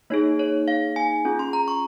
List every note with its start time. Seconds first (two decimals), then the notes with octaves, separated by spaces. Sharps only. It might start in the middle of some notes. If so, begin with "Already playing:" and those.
0.10 A#3 D#4 G#4 C#5
0.39 C#5
0.68 F5
0.96 G#5
1.25 C#4 F4 G#4
1.39 C6
1.53 A#5
1.68 C#6